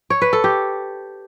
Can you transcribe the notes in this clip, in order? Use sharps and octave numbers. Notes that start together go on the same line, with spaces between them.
C#5
B4
A4
G4